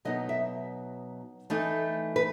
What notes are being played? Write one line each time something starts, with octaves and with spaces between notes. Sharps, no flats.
B2 F#3 B3 D#4 D#5
E5
E3 A3 D#4
B4